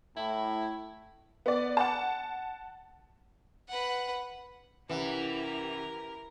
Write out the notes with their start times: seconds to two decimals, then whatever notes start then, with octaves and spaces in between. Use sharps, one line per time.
0.16 A2 E4
1.46 B3 D5
1.77 F#5 A5
3.69 B4 F#5
4.89 C2 E3 C#4 E4 G4 A#4 F#5